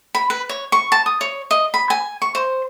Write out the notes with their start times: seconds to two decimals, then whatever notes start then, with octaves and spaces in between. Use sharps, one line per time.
0.15 B5
0.30 B4
0.49 C#5
0.72 C#6
0.92 A5
1.06 D#6
1.21 C#5
1.51 D#5
1.74 B5
1.90 G#5
2.22 C#6
2.35 C5